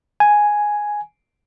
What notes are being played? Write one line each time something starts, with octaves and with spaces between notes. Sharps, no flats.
G#5